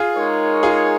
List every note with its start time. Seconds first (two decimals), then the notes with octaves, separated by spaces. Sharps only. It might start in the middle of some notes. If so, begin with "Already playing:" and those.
Already playing: F4 G#4
0.16 G#3 D#4 A#4 C#5
0.63 F4 G#4